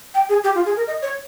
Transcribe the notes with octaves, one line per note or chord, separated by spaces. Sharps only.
G5
G#4
G4
F4
G#4
A#4
D#5
C#5